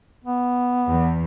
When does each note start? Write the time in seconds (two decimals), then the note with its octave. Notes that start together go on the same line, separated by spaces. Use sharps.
0.24 B3
0.88 E2